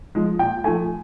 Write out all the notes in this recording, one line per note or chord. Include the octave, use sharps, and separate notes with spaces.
F3 G#3
A#2 G5
F3 A3 G#5